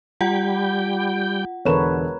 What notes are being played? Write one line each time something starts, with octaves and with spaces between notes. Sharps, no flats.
G3 F4 F#5 G5
E1 D3 A#4 B4 C#5 E7